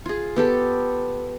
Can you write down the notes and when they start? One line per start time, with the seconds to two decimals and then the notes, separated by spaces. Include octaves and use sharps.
0.06 F4 G#4
0.36 B3 G4 A4